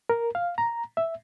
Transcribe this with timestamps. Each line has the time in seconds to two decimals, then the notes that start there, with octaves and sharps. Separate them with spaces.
0.10 A#4
0.35 F5
0.58 A#5
0.97 E5